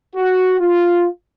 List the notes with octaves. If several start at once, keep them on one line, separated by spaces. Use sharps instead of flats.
F#4
F4